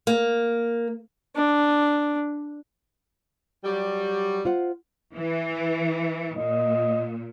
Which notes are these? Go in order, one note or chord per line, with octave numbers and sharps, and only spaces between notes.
A#3
D4
F#3 G3
F4 C5 F#5
E3
A#2 D#5